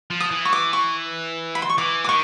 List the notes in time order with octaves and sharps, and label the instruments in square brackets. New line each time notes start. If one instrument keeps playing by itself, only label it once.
[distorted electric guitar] F3
[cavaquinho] D#6
[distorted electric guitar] E3
[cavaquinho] C#6
D6
C#6
B5
C6
C#6
[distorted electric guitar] E3 [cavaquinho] D6
[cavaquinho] D6
[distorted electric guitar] D#3 [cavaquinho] C#6